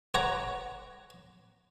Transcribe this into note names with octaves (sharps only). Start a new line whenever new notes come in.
C#5 F#5 A#5